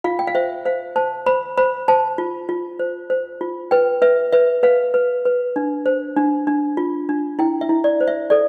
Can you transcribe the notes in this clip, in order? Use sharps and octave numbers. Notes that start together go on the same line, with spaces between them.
F4 F5
G5
F5
C5 E5
C5 F5
C5 A5
C5 B5
C5 B5
C5 A5
F4
F4
C5
C5
F4
B4 G5
B4 E5
B4 E5
B4 F5
B4
B4
D4
C5
D4
D4
F4
D4
E4 G5
E5
E4
D5
C5
E5
A4 D5